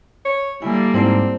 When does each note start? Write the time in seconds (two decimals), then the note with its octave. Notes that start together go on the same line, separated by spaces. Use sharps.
0.25 C#5
0.62 D3 G3 A#3 E4 G#5
0.94 G#2 C4 E4 D5 A5